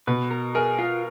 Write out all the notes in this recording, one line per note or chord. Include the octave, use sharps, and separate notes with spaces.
B2 B4
A#4
G#4 A#4
F4